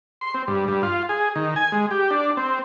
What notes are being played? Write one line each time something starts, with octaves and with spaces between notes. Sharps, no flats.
C6
C4
G2
G2
F4
G#4
D#3
G#5
G#3
G4
D4
C4